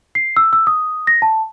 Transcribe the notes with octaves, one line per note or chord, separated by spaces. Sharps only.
C7
E6
E6
D#6
A#6
A5